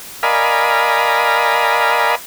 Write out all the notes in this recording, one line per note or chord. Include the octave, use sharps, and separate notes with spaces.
A#4 D5 D#5 F5 G#5 B5